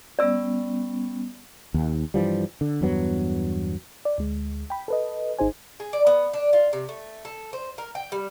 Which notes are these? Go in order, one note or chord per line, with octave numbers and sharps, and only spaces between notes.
G3 B3 C#4 D5 E6
D#2
G2 E3 F3 G3
D3
E2 G2 F#3 B3
D5
D2 G#3
G5 B5
A4 B4 D#5
G#1 D#4 G#4 C5 G#5
G#4
D5
B3
D4
F4
C3
A3
A4
C5
A#4
G5
G3